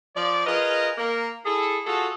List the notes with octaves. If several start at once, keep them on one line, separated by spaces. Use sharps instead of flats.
F3 D5
F4 G#4 A#4 B4 D#5
A#3 A#4
E4 G#4 A4
F4 F#4 G#4 A4